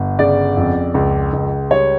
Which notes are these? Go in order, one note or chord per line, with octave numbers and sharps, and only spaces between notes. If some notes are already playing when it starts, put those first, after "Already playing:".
Already playing: G1
C#3 D5
F2
C#2
C#2
G3 C#5